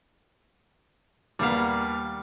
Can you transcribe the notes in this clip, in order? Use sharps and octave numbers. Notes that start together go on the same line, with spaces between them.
D#2 G3 A#3 B3 F5